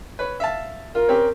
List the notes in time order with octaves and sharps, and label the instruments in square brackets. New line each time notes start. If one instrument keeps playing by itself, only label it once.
[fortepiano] B4 C#5
E5 F5 A5
[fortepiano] F4 [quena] A#4
[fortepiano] C4 C#4 G4